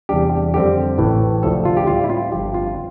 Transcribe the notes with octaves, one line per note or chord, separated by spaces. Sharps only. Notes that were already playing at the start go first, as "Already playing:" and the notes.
E2 C3 G3 D4 G4
F2 D3 G3 C4 G4
A1 A2 E3
D2 C3 F3 C4 A4
F4
G4
A2 G3 C4 F4
E4
F4
G1 G2 F3 C4 G4
F4